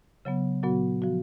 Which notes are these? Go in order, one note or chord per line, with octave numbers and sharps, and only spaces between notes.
C#3 F#3 B3
A#2 F#3 B3 F#4
F3 B3 F#4